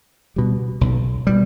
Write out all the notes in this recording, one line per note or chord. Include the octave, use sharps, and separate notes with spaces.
B2 G3
B1
B2 G3